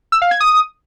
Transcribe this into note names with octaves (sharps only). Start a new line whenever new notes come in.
E6
F5
G#6
D#6